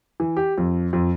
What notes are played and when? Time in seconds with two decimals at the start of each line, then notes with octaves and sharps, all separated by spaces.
0.20 E3
0.37 G4
0.58 F2
0.93 F2